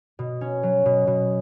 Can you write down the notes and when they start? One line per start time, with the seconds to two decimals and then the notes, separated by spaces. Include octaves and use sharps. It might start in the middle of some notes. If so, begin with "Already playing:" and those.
0.19 B2
0.41 C#4
0.63 F#3
0.86 B2
1.07 B2